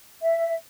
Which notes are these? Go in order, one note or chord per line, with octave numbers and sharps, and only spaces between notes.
E5